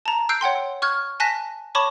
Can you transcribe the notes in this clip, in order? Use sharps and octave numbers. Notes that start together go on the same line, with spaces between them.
A5 A#5
E6 F#6 G6 C7 D7
C#5 F#5 G5 C6
C#6 F6 F#6 G#6
G#5 A5 F#6 A#6 B6
C#5 A5 B5 C#6 D6